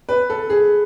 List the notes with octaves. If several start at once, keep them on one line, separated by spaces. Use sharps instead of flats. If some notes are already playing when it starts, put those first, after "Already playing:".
B4
A4
G#4